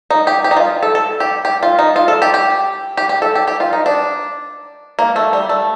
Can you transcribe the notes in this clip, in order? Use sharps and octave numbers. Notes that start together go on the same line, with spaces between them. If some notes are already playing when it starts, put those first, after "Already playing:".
D#4
G4
G4
D#4
F4
A4
A4
G4
G4
F4
D#4
F4
A4
G4
G4
G4
G4
A4
G4
G4
F4
D#4
D4
A#3
A3
G3
A3